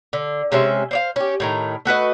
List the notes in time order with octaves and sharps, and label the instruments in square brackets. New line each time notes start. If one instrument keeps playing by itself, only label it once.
[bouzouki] D3
C3 G#3 C#4 E5
C5 D5 F5
C#4 G4
A2 D#3 A#5
A3 F#4 B4 D#5